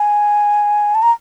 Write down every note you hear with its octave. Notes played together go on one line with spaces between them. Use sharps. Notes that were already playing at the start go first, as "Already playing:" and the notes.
Already playing: G#5
A5
A#5